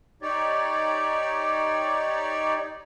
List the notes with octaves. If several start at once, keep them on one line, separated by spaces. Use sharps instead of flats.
D#4 G4 C#5 D5